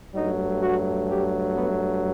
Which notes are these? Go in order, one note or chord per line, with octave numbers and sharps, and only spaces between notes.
G2 F#3 A3 D#4
F#4
G4
B3